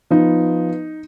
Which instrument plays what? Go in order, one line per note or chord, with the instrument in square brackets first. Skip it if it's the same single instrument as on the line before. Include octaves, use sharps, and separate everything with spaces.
[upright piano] F3 B3 D#4